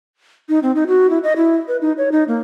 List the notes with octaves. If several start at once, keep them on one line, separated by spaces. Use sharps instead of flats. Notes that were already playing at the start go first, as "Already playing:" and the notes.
D#4
C4
D#4
F#4
E4
D#5
E4
B4
D#4
C#5
D#4
A#3